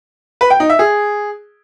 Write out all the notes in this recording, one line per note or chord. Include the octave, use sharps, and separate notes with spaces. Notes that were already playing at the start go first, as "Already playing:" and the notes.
B4
G5
D#4
E5
G#4